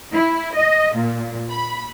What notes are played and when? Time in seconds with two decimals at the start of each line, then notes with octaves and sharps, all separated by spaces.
0.12 E4
0.55 D#5
0.95 A#2
1.50 B5